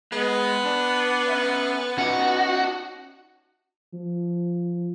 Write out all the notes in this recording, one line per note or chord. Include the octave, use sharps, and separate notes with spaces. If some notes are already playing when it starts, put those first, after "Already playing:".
G#3 B3
D4
C#4 E5
C#4 D#4 F#4
F3